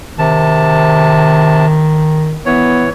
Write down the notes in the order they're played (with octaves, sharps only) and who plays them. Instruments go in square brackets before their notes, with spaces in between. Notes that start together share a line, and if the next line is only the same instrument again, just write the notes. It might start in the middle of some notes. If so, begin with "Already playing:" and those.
[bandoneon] C3 A5 [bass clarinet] D#3
[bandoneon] E3 C#5 [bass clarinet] B3